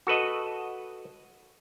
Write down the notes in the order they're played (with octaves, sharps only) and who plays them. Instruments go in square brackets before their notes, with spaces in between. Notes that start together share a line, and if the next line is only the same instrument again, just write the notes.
[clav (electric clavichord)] F#4 A4 B4 D#5